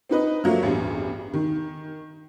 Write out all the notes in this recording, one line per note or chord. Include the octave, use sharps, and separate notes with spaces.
C4 D#4 B4 D#5
F3 F#3 A3 A#3
A1 E2 G2
D#3